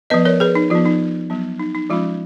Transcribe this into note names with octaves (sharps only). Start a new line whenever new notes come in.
F3 B3 B4 D#5
A#4 C#5
G#4 B4
D#4
F3 B3 F4
D#4
F#3 B3
D#4
D#4
F3 G#3 C#4 F4